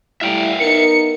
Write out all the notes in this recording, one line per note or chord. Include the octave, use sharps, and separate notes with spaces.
G3 A3 E4 E5 F5 G5
B3 D#4 A#4 C#7